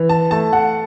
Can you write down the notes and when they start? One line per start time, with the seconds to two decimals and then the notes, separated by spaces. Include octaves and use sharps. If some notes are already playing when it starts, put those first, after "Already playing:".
Already playing: E3
0.09 A5
0.31 A3 A5
0.53 F#5